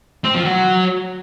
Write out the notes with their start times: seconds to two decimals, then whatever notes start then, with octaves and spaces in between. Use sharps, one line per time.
0.24 C4
0.35 F3
0.45 F#3